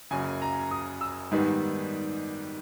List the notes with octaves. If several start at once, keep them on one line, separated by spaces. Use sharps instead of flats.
F#1 F#2 C#3 G#5
A#5
D#6
E6
G#2 D#3 G3 B3